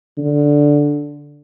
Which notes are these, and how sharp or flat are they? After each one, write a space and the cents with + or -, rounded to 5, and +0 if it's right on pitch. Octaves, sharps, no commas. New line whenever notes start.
D3 -5